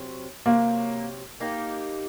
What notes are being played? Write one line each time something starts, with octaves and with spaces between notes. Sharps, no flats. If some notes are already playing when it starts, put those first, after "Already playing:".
Already playing: C3 F#3 C4
C3 F#3 A#3 C4
A#3 D#4 G4